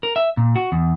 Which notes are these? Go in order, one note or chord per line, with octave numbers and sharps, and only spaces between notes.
A#4
E5
A#2
F#4
E2